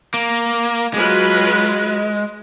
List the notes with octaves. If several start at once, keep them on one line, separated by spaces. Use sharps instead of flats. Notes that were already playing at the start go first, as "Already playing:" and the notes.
A#3
F#3 G#3 F4 B4